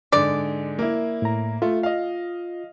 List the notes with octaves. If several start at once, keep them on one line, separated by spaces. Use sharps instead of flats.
G#2 D3 D5
A#3 E4
A2 A#5
A3 F4
D#5 F5